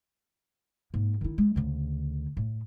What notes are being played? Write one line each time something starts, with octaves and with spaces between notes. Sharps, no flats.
G#2 A#3
D#3 E4
G#3
D2 C#3
A2